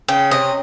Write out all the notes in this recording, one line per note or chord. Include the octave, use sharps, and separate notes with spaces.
C#3 G5
C3 D#5